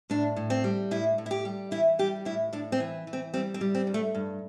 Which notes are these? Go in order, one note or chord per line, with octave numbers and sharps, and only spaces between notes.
A2 D4
A2
C4
G3
A2 E4
A2
E4
G4
G3
E3 E4
G3 G4
A2 E4
A2 D4
C4
E3
E3
C4
G3 C4
C4
G3
C4
G2
A3
G2